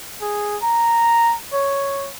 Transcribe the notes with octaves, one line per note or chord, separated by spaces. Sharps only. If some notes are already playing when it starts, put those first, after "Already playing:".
G#4
A#5
C#5